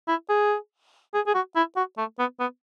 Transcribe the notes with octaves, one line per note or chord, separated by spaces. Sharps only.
E4
G#4
G#4
G#4
F#4
E4
F#4
A3
B3
B3